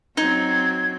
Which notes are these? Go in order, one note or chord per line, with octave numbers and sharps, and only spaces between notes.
F#3 C4 D#4 G#6